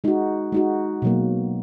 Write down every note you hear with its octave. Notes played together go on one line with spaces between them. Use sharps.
G#3 D#4 F#4
G#3 D#4 F#4
B2 F#3 A#3